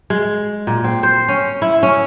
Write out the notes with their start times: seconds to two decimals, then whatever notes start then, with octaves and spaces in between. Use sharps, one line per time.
0.10 G#3
0.67 A#2
0.84 C4
1.03 C5
1.28 C#4
1.62 E4
1.83 C#4